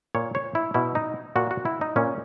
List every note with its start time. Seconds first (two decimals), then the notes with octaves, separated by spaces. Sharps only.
0.15 A#2 C#5
0.35 C#5
0.55 E4
0.74 B2 E4
0.95 D#4
1.36 A#2 F#4
1.51 F#4
1.65 E4
1.81 D#4
1.96 A#2 C#4